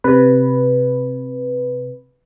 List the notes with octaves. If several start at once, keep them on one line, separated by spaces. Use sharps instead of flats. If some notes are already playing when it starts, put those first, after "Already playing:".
C3 B4